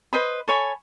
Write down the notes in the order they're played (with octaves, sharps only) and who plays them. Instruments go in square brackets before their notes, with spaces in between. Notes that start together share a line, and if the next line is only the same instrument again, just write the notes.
[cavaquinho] B4 C5 D#5 B5
A4 C#5 G#5 B5